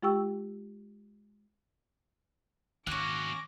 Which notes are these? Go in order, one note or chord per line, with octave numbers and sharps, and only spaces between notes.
G#3 F4 G4 G5 C#6 E6
G#2 D#3 F#3 A#3 C#4 D6 F#6 A#6